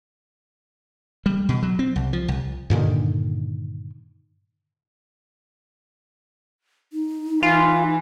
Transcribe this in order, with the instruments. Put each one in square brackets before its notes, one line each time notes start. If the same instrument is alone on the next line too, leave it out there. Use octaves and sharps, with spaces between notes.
[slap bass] G3
B2
F#3
C4
C2
F3
C2
[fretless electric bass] G2 A#2 D3 D#3
[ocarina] D#4
[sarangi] E3 [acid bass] F4